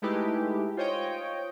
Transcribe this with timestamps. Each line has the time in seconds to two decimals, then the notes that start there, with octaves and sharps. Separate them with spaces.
0.02 G#3 A3 D#4 E4 G4 B4
0.77 F4 C5 C#5 D#5 G5